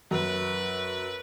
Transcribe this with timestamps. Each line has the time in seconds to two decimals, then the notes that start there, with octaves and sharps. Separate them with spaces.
0.11 F#2 B4